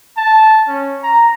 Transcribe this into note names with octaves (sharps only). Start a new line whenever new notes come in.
A5
C#4
A#5